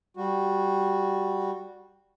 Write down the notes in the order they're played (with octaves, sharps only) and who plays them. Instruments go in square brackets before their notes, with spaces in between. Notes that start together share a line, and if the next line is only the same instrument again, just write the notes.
[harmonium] G3 F#4